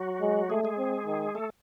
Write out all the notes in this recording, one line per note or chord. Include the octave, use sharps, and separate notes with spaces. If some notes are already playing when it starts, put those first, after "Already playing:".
Already playing: F#3 F#4
G#3
G#3 A3 G#4
G#3 G#4
C4
D#3
A3 A4